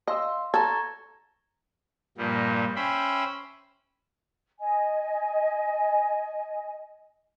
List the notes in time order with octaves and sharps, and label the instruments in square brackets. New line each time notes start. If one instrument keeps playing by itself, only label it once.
[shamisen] D#5 [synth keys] F5 C6 E6
[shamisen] A4 [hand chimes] A#5 C#6 G#6 [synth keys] A6
[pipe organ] G2 A#2 F3 G3
C#4 C5 E5 G5 B5
[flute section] D#5 G#5